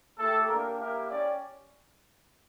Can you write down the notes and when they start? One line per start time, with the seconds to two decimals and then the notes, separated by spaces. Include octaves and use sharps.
0.19 A3 E4 G4 A4
0.49 A#3 D4 G4 A#4
0.79 A#3 E4 G4 A#4
1.10 C#4 G4 D5